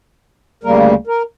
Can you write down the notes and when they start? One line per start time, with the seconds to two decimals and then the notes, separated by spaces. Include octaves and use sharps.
0.64 D2 C#3 G3 A#3 A#4
1.07 A#4